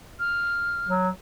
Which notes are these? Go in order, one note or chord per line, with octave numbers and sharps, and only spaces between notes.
F6
F#3